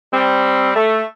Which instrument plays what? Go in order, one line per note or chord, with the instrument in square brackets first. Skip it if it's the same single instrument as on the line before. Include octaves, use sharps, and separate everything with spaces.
[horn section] G3 C4
A3